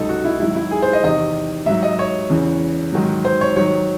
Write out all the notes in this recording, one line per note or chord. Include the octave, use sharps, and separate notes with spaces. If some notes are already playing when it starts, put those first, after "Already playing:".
Already playing: C#2 C3 F#3 D#4 A4
F#4
E4
G#2 D#3 F#3 E4
E4
G#4
C5
D#5
E2 C3 D#3 D#5
G#2 F#3 E5
D#5
C#5
E2 C#3 E3
G#2 D#3 F#3
C5
C#5
G#2 D#3 F#3 C#5